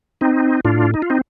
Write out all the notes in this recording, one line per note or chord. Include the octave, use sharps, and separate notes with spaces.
C4 D#4
A2 D4 F4
D#4
F4
C4 D#4